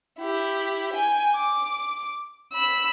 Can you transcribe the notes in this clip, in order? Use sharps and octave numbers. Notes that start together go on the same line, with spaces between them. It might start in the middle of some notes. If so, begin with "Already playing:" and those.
E4 G4
G5 G#5
D6
B5 E6